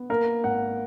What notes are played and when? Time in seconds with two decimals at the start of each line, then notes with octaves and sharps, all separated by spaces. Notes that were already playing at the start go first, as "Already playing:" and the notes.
Already playing: B3
0.10 A#3 A#4
0.44 G#1 F#5